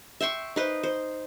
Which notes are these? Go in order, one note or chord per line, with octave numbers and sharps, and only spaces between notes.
E5 G5 C6 C#6
D#4 B4 C5
C5